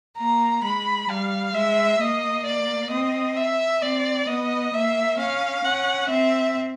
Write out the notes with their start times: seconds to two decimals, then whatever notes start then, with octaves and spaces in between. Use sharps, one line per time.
0.18 A#3 A#5
0.64 G#3 B5
1.09 G3 F5
1.54 G#3 E5
2.00 A#3 D#5
2.45 D5
2.90 C4 D#5
3.36 E5
3.82 C4 D5
4.27 B3 D#5
4.73 A#3 E5
5.18 C#4 F5
5.64 C#4 F#5
6.09 C4 E5